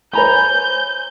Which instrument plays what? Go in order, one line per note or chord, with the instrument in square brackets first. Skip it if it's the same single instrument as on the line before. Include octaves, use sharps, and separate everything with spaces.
[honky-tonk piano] C5 G#5 [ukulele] C#5 A#5 B5 [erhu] G6